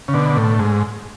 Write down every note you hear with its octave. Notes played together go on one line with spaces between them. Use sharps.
C#3
B2 D3
A2
G#2